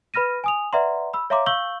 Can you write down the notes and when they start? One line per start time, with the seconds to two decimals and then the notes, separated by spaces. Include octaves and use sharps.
0.14 B4 B5 F6 A#6 D#7
0.44 G#5 D#6 F7
0.73 B4 D5 E5 F#5 A#5 C6
1.13 B5 E6
1.30 C#5 E5 F5 A#5 C6 D6
1.46 F5 C#6 E6 G6 F#7 G7